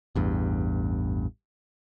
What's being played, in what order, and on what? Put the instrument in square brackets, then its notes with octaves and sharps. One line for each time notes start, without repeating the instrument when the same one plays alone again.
[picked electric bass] A1 E2 G2